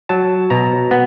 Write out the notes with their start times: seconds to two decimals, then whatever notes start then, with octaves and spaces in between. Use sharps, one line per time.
0.09 F#3 A5
0.50 B2 A#5
0.91 B3